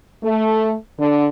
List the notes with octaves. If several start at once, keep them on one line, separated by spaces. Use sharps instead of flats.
A3
D3